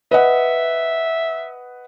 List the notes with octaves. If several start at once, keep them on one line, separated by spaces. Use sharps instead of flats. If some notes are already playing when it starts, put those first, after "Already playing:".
B4 D#5 E5 F#5